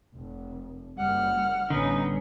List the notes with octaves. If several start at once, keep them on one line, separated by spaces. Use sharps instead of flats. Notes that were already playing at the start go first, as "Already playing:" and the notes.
F1
F#1 G3 F#5 F6
A1 D3 G3 B3 C#4 D#4